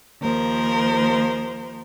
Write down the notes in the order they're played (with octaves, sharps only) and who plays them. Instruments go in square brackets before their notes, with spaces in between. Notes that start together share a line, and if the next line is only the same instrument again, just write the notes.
[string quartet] D#2 F3 A#4 C5